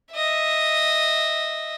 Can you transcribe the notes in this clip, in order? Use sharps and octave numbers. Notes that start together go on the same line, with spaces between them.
D#5 E5